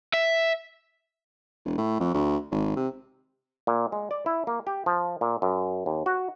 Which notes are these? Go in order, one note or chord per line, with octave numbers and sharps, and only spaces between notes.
E5
E1
A2
F2
D2
G#1
C3
A#2
G#3
D5
E4
A#3
G4
F3
A#2
F#2
D#2
F#4